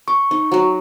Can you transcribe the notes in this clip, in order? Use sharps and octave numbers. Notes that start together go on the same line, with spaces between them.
C#6 D6
D#4
F#3 F#4